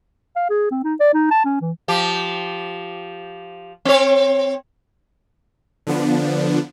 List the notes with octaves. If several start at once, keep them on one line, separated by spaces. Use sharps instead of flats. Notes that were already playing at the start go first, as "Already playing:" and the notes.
F5
G#4
C4
D#4
D5
D#4
A5
C#4
E3
F3 G4
C4 C#5
D3 F3 B3 D4